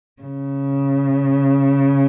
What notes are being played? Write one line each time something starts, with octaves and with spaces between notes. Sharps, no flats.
C#3